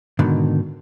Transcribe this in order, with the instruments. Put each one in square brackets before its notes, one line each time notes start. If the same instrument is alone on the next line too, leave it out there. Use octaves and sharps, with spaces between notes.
[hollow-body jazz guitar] G#2 B2 D3 D#3